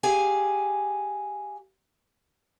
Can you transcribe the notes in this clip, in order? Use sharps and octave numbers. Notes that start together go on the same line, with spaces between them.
G4 G#4 F5 G#5